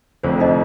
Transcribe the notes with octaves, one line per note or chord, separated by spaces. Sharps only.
F1 F2 D3 F3 C4 C5
D#4 D#5